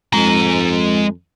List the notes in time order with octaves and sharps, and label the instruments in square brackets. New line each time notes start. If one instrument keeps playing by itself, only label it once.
[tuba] F2 [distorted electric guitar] G#3 A#5